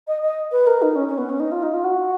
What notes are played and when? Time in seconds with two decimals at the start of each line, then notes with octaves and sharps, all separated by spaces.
0.08 D#5
0.23 D#5
0.52 B4
0.67 A#4
0.82 D#4
0.96 C#4
1.08 C#4
1.18 B3
1.29 C#4
1.40 D#4
1.52 F4
1.63 D#4
1.74 F4
1.84 F#4